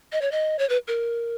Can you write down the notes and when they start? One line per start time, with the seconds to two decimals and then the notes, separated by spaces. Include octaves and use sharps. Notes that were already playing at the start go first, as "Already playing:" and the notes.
0.12 D#5
0.21 C#5
0.32 D#5
0.59 C#5
0.69 B4
0.88 A#4